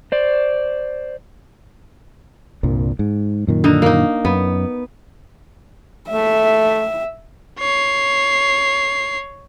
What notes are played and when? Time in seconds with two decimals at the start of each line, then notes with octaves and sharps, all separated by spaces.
0.12 C5 D5
2.63 C2 G2 A#2
2.99 G#2
3.47 F#2 A#2 D#3
3.64 D3 D#4
3.82 A#3 D#4
4.25 F#2 B3
6.09 A3 E5
7.59 C#5 C7